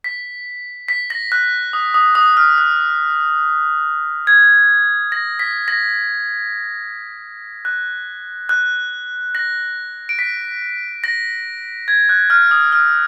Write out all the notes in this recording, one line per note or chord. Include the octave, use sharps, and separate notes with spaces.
B6
B6
A#6
F#6
D#6
D#6
D#6
F6
F#6
G#6
A#6
B6
A#6
F#6
F#6
A#6
D7
B6
A#6
G#6
F#6
F6
D#6
F6